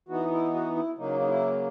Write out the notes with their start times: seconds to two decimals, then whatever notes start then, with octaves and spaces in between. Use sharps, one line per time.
0.09 E3 B3 D#4 F#4
0.31 E4
0.54 F#4
0.76 E4
0.98 C#3 F#3 A#3 D#4
1.20 D#4
1.28 E4